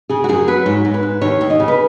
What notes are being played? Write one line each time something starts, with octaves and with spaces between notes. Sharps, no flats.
C#3 G#4
F#4
F#2 G#4
F#3 B4
G#2 C#5
G#2
B4
G#2
D#2 C#5
D#2
D#5
C#3
B4